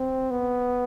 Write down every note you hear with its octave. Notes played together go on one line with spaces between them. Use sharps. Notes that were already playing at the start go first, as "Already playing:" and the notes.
Already playing: C4
B3